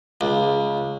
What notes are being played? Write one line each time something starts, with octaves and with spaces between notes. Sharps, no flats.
C#2